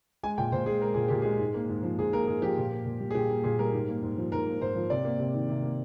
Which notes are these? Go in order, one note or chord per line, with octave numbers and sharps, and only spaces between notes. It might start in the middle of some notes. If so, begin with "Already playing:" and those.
G#3 G#5
A#2 G5
A#2 C5
G#3 G#4
G#3 A#4
A#2 G#4
A#2 G4
G#3 G#4
G#2
A#3
G#2
F3
G#2 G#4
A#3 A#4
G#2 G#4
F3 G4
A#2
A#3
A#2
G3
G#4
A#2 G4
A#3
A#2 G#4
G3 A#4
G#2
A#3
G#2
F3
G#2 A#4
A#3
G#2 C5
F3
C3 D5
A#3
C3
D#3
C3
A#3